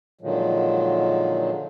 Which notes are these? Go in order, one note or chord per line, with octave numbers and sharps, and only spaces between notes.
A#2 D3 D#3 F3 F#3 G#3